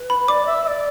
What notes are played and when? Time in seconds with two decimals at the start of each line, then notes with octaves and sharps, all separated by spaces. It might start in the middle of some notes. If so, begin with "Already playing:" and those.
Already playing: B4
0.10 B5
0.28 D5 D6
0.46 E5
0.64 E5
0.67 D5